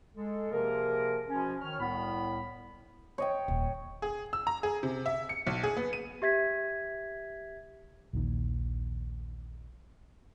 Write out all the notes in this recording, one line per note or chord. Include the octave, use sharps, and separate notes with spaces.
G#3 A4
C3 F3 A#3 G#4 A#4
B2 F3 C#4
D#3 C#5 F6
C2 A2 B3 B5
C#5 D#5 G5
D#1
G#4
E6
A#5
G#4
C3
E5
C#7
B1
G#4
B3
D#7
G4 E5 G#6 B6
A#1 D#2 D#3